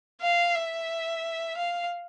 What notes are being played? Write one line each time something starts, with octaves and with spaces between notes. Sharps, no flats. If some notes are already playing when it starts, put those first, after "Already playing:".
F5
E5
F5